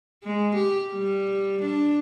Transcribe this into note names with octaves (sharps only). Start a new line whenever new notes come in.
G#3
G4
G3
D4